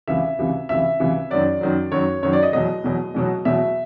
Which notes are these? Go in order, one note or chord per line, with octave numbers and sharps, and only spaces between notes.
C#2 C3 E3 E5
C#2 C3 E3
C#2 C3 E3 E5
C#2 C3 E3
F#2 D#3 F#3 D5
F#2 D#3 F#3
F#2 D#3 F#3 C#5
F#2 D#3 F#3 C#5
D5
D#5
E2 B2 F#3 D#5
E2 B2 F#3
E2 B2 F#3
E2 B2 F#3 E5